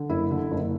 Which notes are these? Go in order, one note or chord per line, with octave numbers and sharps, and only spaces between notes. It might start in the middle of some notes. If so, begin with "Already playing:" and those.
Already playing: D3
F#1 E4
D3
F#1